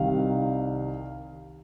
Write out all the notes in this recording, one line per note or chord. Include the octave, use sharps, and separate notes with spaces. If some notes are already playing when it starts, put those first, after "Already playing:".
Already playing: C2 C3 D#3 F5